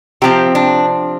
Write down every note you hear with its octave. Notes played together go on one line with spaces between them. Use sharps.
C3 F3 C4 G4
D4